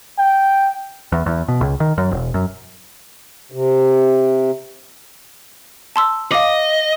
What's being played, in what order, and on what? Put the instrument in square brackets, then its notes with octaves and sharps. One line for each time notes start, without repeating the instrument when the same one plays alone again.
[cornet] G5
[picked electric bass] E2
E2
B2
C#2
D#3
F#2
E1
F#2
[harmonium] C3
[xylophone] A5 C6 E6
[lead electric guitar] D#5 [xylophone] F5 D6